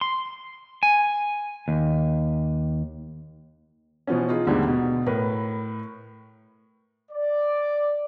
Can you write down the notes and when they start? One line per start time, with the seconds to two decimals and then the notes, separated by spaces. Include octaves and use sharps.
0.01 C6
0.83 G#5
1.68 D#2
4.07 B2 E3 F3 B3 C#4
4.28 D#4 F4 G#4
4.47 D#2 G#2 D3 G3 A3 B3
4.68 B2
5.06 A2 A#4 B4
7.11 D5